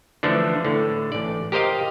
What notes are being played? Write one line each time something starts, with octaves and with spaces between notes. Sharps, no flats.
D3 E3 F3 A3 D4
A2 D3
A1 D5
G4 A#4 C5 D#5 F5